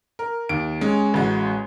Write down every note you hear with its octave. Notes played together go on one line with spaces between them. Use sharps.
A#4
D#2 D7
G#3 C#4
A1 F#4